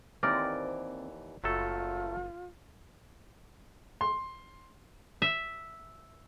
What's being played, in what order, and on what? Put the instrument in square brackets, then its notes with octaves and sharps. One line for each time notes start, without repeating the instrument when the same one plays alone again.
[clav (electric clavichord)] D#2 E3 [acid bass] C4 [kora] A#4 D5
[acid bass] F#1 [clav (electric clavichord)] F#3 A3 A4 [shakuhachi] F4
[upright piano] C6
[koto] E5